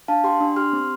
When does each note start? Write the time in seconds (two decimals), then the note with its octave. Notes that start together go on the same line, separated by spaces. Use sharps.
0.08 D4 F5 A5
0.24 G4 G5 C6
0.40 D4
0.56 G4 C6 F6
0.73 C4